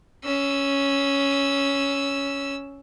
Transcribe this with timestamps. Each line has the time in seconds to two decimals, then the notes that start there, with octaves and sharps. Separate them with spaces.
0.24 C#4 E6